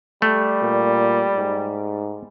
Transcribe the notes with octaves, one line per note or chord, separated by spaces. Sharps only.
G3 A3
A#2
G#2